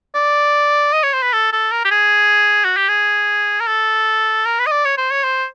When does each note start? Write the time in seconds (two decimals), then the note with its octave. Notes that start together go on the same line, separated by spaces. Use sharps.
0.15 D5
0.93 D#5
1.03 C#5
1.14 C5
1.23 B4
1.33 A4
1.53 A4
1.72 A#4
1.85 G4
1.91 G#4
2.65 F#4
2.77 G4
2.89 G#4
3.60 A#4
3.67 A4
4.46 A#4
4.59 B4
4.67 D#5
4.72 D5
4.85 C#5
4.98 C5
5.11 C#5
5.24 C5